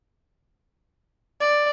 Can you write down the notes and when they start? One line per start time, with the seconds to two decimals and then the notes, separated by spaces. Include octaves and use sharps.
1.41 D5